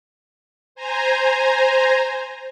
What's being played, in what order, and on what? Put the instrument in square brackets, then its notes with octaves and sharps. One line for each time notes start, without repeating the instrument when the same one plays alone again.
[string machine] C5 G#5 A#5